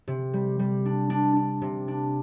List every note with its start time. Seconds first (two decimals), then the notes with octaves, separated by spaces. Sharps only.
0.08 C3
0.34 G3
0.59 G3
0.85 D4
1.10 D4
1.36 D4
1.62 C3
1.88 D4